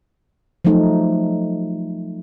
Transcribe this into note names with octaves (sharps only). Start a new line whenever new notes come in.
F3 F#3 A3 D#4 A4